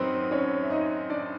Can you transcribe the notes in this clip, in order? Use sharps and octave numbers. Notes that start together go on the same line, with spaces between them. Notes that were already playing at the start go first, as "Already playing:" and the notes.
Already playing: F#2 D#3 F#3 B3 C4 B4 C5
C#4 C#5
E5
D#4 D#5
D4 D5